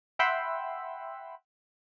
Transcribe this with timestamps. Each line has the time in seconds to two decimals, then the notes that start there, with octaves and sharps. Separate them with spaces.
0.19 E5 F#5 G5 B5 C6 E6